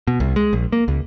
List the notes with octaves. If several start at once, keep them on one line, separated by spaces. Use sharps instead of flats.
B2
C2
G#3
A#1
A#3
C#2